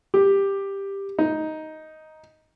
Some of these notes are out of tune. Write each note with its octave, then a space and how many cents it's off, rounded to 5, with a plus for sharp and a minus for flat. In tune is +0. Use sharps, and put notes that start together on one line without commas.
G4 +10
D#4 +5